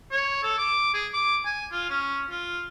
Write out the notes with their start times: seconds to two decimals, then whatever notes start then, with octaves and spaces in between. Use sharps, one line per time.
0.12 C#5
0.43 A4
0.58 D6
0.94 G#4
1.13 D6
1.46 G#5
1.72 F4
1.90 C#4
2.30 F4